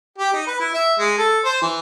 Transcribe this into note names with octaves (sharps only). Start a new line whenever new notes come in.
G4
D#4
B4
E4
E5
G#3
A4
C5
E3